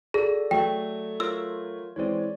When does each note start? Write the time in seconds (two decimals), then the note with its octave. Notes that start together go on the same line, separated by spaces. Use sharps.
0.14 F#4 G#4 A4 D5 A#6
0.51 F#3 A3 G5
1.20 F4 A#4 C#5 E6
1.96 E3 G#3 C4 C#5 D5